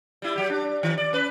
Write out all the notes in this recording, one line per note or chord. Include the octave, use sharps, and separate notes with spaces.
G3 E4
F#3 G4
D4
D#3
D5
C#4 B4